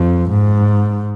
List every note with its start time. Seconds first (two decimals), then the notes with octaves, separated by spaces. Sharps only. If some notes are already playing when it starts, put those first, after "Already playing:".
Already playing: F2
0.30 G#2